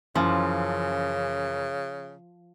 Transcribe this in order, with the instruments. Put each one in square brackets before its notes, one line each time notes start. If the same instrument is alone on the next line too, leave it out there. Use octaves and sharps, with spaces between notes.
[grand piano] F#2 E3 [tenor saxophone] C#3 [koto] F3